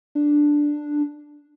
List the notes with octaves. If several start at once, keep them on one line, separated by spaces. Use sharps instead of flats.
D4